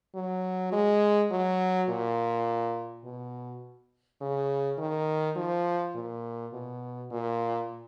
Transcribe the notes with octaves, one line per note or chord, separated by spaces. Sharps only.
F#3
G#3
F#3
A#2
B2
C#3
D#3
F3
A#2
B2
A#2